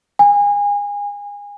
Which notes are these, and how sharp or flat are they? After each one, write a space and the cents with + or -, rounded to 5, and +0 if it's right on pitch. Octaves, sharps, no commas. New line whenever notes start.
G#5 -30